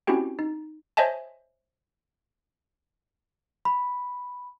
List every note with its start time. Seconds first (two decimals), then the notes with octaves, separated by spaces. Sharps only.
0.07 C4 C#4 E4 F#4 G4 G5
0.39 D#4
0.97 C5 C#5 D#5 E5 G#5 A5
3.65 B5